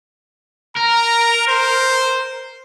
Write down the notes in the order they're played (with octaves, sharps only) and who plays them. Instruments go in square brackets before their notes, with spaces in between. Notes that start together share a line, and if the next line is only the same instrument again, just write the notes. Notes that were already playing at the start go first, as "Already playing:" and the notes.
[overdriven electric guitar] A#4 [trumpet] A#5
[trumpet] C5